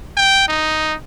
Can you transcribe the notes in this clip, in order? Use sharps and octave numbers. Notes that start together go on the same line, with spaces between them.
G5
D#4